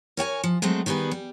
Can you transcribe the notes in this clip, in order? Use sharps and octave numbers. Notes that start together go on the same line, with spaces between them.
A#4 C#5 G5 G#5
F3
F#3 G#3 A3 C4
D#3 G3 B3 G#4 B4
G3